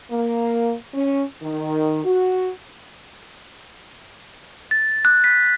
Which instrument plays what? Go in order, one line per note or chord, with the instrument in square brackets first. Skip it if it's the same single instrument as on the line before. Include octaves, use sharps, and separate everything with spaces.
[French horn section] A#3
C#4
D#3
F#4
[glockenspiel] A6
F#6
B6